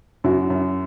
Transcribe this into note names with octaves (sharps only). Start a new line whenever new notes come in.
F#2 E4 F#4
F#2